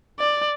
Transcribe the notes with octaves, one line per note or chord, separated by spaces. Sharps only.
D5